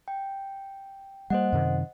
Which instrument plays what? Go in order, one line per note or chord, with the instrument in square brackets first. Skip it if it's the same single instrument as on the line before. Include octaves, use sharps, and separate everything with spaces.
[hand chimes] G5
[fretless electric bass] G3 A#3 [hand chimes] C5 D#5 F#5
[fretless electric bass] F#2 C3 D#3